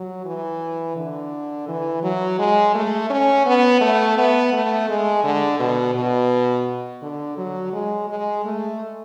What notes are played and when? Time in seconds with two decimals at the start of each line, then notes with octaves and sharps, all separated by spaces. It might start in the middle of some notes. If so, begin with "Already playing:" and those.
Already playing: F#3
0.25 E3
0.96 D3
1.68 E3
2.03 F#3
2.39 G#3
2.75 A3
3.10 C#4
3.46 B3
3.81 A3
4.18 B3
4.53 A3
4.89 G#3
5.24 D3
5.59 B2
5.95 B2
7.02 D3
7.38 F#3
7.73 G#3
8.08 G#3
8.45 A3